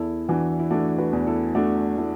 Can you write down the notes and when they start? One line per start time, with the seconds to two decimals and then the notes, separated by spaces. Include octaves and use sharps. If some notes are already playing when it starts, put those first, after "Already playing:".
Already playing: E2 E4 A4
0.29 E3 D4 F#4
0.59 E4
0.71 A3 D4 F#4
0.98 F#4 B4
1.13 E2
1.27 E4 A4
1.55 A3 D4 F#4
1.97 A3 E4 A4